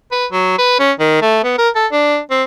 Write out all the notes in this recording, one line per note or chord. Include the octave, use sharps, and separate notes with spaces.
B4
F#3
B4
C#4
D#3
A3
B3
A#4
A4
D4
C4